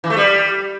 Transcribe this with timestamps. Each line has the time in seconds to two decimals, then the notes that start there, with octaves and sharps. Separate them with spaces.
0.04 E3
0.10 A3
0.17 G3